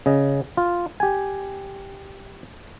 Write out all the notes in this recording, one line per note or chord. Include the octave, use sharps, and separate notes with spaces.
C#3 D#5
F4
G4 G#5